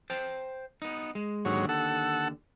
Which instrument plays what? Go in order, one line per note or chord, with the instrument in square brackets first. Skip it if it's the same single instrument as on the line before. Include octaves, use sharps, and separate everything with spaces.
[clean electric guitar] C5 G5 A5
B3 D#4
G#3
[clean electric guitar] D#2 D3 [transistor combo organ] G#2 F#3 C#5
[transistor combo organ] A4 F#5 E6